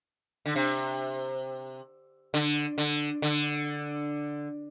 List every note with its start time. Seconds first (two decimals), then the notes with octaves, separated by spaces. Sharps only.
0.46 D3
0.55 C3
2.34 D3
2.78 D3
3.22 D3